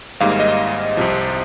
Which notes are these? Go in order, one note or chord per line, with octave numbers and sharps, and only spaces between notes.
G#1 G#2 G3 A#3 F5
D#5
C2 C3 F3